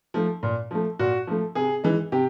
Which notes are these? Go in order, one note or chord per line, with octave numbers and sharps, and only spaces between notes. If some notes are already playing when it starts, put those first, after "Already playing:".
F3 A3
A#2
F3 A3
A#2 F#4
F3 A3
C3 G#4
E3 G#3
C3 G4